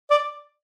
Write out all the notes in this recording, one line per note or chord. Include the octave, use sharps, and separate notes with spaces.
D5